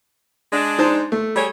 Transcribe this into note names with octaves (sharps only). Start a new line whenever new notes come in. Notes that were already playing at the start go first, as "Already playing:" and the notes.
G#3 D4
D#4 C5 A5
A3
G3 G#4 C#5